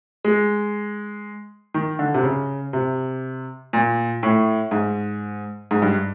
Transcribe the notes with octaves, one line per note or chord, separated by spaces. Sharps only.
G#3
D#3
D3
C3
C#3
C3
A#2
A2
G#2
G#2
G2